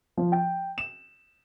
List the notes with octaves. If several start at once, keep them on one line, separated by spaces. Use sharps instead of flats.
F3
G5
E7